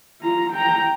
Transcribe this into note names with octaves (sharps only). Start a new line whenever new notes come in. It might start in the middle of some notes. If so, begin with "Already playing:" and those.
F4 A#5
G5 A#5